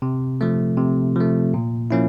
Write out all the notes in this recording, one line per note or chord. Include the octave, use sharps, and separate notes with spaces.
C3
F3 A3
C3
F3 A3
A#2
F3 A#3 C#4 E4